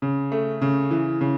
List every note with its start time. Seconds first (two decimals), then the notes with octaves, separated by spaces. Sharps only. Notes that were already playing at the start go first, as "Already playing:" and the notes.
0.02 C#3
0.32 A3
0.61 C#3
0.91 E3
1.21 C#3